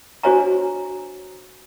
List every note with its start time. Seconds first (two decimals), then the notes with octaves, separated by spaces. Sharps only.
0.23 D4 F#4 C5 C#5 G#5 A#5